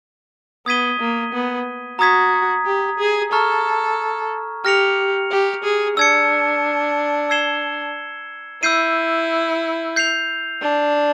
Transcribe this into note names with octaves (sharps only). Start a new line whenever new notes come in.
B3 D#6 G#6 B6 D#7 G7
A#3
B3
F#4 A#5 D#6 G#6 B6
G4
G#4
A4 A#5 C#6 F6
G4 F6 A#6 C#7 F7
G4
G#4
D4 E6 G#6 C#7
E6 G#6 C7 E7 G7
E4 E6 G6 C7 D#7
G6 C7 F7
D4